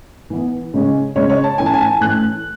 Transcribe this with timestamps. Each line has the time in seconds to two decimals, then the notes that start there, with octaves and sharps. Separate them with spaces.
0.30 E3 B3
0.74 C#3 G#3 C#4
1.15 C#3 G#3 C#4 C#5
1.30 C#5
1.44 A5
1.58 A2 E3 A3 C#4 G#5
1.66 A5
1.74 G#5
1.81 A5
1.88 G#5
2.01 A2 E3 A3 C#4 F#6